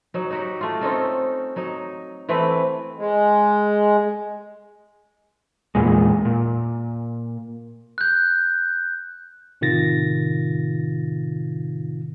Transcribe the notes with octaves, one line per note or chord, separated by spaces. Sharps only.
F#3 D#4
D#4 F#4 G4
A3 F4
C4 C#4 D#4 A4
F#3 D#4
E3 A3 C4 B4
G#3
E2 A#2 G#3
A#2
F#6 G6
A2 C3 D#3 F4 A6 A#6